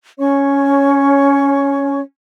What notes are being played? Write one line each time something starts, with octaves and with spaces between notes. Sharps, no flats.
C#4 C#5 C#6